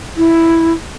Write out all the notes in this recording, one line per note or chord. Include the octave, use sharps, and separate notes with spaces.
E4